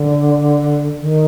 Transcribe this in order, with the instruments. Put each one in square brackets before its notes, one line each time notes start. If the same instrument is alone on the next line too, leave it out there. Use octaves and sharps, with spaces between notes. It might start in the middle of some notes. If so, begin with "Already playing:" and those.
Already playing: [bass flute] D3
D#3